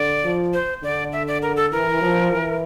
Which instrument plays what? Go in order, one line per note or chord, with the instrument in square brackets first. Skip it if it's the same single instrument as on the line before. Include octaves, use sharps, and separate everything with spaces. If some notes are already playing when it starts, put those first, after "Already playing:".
Already playing: [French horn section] D3 [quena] D5
[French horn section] F3
[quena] C5
[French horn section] D3 [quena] D5
[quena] E5
D5
A#4
A4
[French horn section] E3 [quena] A#4
[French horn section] F3
E3